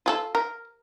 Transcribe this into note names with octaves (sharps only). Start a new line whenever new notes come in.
F4 G#4 A4
A#4